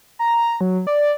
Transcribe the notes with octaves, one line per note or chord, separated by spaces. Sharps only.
A#5
F#3
D5